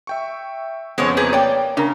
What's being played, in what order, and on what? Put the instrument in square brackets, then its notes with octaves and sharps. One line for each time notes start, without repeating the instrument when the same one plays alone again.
[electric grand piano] E5 G5 C#6
[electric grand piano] F2 C#3 B3 [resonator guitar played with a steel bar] G#3 C5 C#5
[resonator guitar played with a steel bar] A#3 G#4 B4 [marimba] G6
[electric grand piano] A#3 [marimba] C#5 [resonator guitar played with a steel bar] D5 G5
[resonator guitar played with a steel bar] C#3 [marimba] D4 A#4 A#5